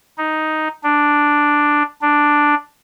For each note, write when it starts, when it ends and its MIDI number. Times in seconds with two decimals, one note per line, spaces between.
0.18 0.68 63
0.84 1.83 62
2.02 2.54 62